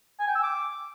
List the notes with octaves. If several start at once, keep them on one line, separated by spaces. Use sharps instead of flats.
G#5
G5
E6
D6